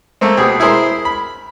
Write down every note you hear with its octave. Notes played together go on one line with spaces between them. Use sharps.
A3 A#3 C4
B2 G4 G#4
E4 G#4 A#4 C5
B5